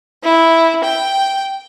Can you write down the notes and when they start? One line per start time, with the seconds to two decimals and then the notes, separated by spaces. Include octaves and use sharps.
0.23 E4
0.84 G5